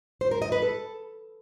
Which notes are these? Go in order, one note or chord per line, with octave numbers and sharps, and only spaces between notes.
C5
A#4
D#5
B4
A4